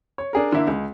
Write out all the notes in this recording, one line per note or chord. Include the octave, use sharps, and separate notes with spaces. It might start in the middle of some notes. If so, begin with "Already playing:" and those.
C#5
D4 G#4 A#4
D3 A#3 E4
C#2